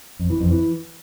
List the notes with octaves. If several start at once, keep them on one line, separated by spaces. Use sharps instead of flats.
F2
E3
F2
E3